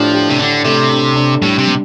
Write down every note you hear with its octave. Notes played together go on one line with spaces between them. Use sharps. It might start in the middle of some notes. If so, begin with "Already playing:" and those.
Already playing: A2 F3 D4 G4
G4
C3
D3 D4
C3 A3
D4
D4
A2 G3
C3
G3